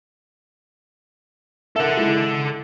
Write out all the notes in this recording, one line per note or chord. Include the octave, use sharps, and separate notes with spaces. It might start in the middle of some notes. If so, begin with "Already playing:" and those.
A4 A#4 E5 F#5
G#3 E4